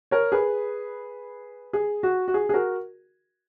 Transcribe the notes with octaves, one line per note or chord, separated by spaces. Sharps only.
A#4 C#5
G#4 B4
G#4
F#4
F#4
G#4
G#4
F#4 A#4